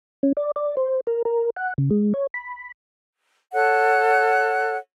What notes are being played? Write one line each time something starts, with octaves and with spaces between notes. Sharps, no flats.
C#4
D5
D5
C5
A#4
A#4
F#5
C#3
G#3
C#5
B5
A4 C#5 F#5 F#6